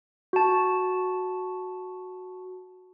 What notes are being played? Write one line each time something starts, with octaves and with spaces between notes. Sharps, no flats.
F#4 A5